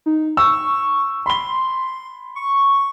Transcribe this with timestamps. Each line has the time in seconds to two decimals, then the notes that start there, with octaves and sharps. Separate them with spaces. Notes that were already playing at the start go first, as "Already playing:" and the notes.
0.06 D#4
0.37 C#6 E6
1.26 B5 C6 G7
2.36 C#6